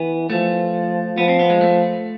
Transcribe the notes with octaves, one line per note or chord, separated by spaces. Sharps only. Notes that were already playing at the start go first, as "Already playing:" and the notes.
Already playing: E3 B3
F3 A3
F3 B3
C4
B3
G#3
A3